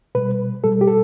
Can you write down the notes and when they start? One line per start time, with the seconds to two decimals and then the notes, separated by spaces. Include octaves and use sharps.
0.15 B2 G3 B4
0.64 B2 G3 A4
0.81 G4
0.87 A4